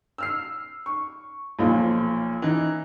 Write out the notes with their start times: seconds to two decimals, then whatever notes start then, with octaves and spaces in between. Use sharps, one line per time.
0.18 E6 F6 C7
0.86 C#6
1.59 B1 A#2 F3
2.42 E3 D#4